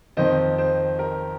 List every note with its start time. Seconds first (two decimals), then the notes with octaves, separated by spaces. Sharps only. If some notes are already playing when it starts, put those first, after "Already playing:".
0.17 F2 D#3 C5 D#5
0.58 C5
0.99 A#4